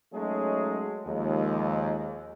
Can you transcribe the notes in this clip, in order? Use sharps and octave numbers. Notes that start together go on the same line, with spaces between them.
F#3 G#3 A3 C#4 D#4 G#4
D#2 F3 G#3